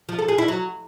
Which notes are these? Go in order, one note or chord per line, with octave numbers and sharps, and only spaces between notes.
F3
A4
G#4
E4
F#3